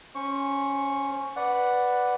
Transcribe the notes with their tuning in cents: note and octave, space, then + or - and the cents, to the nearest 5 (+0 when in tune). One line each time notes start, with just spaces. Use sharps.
C#4 +0 C5 +25 C#6 +0
B4 +0 D5 +0 F#5 +0